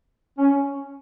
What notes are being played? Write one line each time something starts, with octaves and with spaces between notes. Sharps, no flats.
C#4